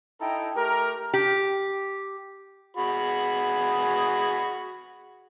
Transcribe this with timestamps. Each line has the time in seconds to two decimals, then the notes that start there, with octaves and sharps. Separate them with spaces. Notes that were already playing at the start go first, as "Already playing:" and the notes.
0.20 D#4 E4 A4 G5 A#5
0.55 A3 G4 A#4
1.13 G4
2.77 F#4 G#4 B5